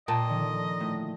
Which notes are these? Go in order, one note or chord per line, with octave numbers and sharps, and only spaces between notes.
A#2 D#5 G5 A5
D3 D#3 F3
A2